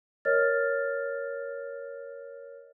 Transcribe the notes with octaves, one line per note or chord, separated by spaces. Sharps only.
A#4 C#5 D#5 F6 A6